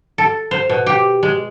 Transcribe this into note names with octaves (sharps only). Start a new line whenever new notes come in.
A4
C5
B2
G4
G#3